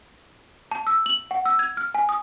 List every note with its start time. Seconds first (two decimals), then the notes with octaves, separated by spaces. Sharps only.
0.71 A5
0.87 E6
1.06 F#7
1.31 F#5
1.46 E6
1.59 G#6
1.77 F6
1.95 G#5
2.09 D#6